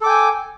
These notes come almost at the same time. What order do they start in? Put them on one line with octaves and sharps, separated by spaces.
A4 D6 G5 G#5